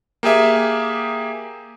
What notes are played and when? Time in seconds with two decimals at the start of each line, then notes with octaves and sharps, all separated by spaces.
0.23 A#3 G4 G#4 E5